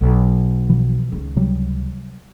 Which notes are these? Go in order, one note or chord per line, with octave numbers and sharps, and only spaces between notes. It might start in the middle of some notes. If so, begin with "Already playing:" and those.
B1
B2 E3 F3
C#2 D#3
C3 F#3 G3